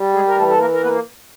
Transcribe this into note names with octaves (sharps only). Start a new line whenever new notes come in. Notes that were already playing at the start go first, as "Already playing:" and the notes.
Already playing: G3
G#3 G#4
A#4
E3 A3 A4
A4
A#3 A#4
A#4
A#3 B3 B4